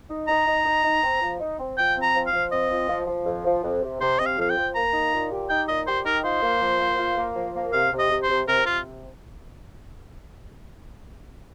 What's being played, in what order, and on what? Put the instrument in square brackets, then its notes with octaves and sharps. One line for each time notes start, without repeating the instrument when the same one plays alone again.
[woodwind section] D#4
[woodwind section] D#4 [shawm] A#5
[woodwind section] D#4
D#4
D#4
C4
F3
D#4
C4
[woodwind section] F3 [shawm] G5
[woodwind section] C4
[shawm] A#5
[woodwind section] F3
[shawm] F5
[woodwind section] F3
[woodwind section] C4 [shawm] D#5
[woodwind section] F3
F3
F3
F2
F3
F2
C3
[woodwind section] C3 [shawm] C5
[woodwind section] C3 [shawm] D#5
[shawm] F5
[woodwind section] F2 [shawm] F5
[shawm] G5
[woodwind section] F3
[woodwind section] A#3 [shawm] A#5
[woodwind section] D#4
A#2
G4
[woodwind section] D#4 [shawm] G5
[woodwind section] A#2 [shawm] D#5
[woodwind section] G4 [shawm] C5
[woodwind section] D#4 [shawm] A#4
[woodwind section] F4 [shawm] C5
[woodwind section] A#3
F3
A#3
F4
A#3
F3
A#3
[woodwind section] C3 [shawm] F5
[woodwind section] C3
[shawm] D#5
[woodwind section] C3
[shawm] C5
[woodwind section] C3
[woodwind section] C3 [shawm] A#4
[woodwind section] C3 [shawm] F4